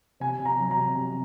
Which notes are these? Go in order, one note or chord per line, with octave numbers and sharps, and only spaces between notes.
C3 G#5
C3
A#5
F#3
A#5
C3
C3